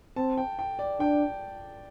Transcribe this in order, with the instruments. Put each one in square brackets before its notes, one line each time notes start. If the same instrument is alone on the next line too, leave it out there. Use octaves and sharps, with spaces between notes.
[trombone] C4 [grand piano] A5
[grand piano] G5
G5
D5
[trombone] D4 [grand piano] G5